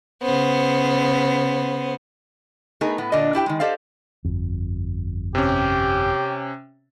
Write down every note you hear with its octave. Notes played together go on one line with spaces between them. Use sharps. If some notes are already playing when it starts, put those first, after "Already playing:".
C#3 B3 C5
A3 B3 D#4 G#4 A#4
A2 B3
A#2 D3 D4 D#5
D4 E4 G4 G5
D#3 G#3
G4 A4 C5 D5 D#5 F5
G1 F2
C3 C#4 G4